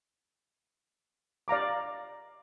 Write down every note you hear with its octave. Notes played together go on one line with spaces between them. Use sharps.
D5 F5 A#5 D6